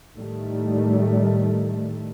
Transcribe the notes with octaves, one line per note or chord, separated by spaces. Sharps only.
A2 D#3 G3 A3